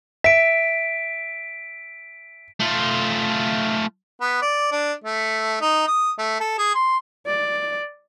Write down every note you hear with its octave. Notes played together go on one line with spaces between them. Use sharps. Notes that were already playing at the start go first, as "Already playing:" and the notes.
E5 B6 D7
A3 F4
B3
D5
D4
A3
D#4
D#6
A3
A4
G#4
C6
D5